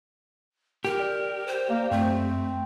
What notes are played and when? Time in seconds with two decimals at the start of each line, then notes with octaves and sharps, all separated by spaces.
0.85 G4 A#4
1.00 D5
1.47 C5
1.70 A#3 D5
1.91 F#2 A3 C4